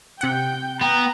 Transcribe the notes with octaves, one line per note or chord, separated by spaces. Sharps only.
C3 F#5 G5 G6
B3 G5 A#5